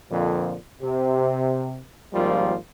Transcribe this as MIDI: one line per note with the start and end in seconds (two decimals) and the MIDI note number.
0.11 0.55 41
0.11 0.55 46
0.11 0.55 50
0.11 0.55 53
0.81 1.80 48
2.13 2.55 32
2.13 2.55 53
2.13 2.55 55
2.13 2.55 58
2.13 2.55 65